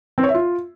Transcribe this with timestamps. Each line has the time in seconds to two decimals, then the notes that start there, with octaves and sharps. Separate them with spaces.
0.18 C4
0.23 C#5
0.29 E5
0.34 F4